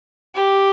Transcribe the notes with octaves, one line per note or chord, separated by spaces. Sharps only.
G4